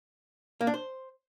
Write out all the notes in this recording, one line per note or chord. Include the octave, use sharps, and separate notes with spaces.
A#3
D4
C5